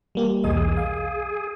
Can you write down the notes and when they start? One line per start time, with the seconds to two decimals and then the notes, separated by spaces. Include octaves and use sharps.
0.15 G3 A#3 G4
0.44 B1 E2 G#4 D#5
0.77 F5